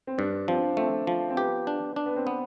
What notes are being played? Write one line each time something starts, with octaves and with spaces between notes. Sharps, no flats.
C4
G2 D4
F3 C4
A3 C4
F3
C4
B3 G4
D4
D4
B3
C4
B3